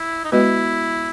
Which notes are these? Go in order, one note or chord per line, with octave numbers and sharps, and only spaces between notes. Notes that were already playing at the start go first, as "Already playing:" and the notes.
Already playing: E4
D#4
G#3 B3 E4 F#4 B4 D#5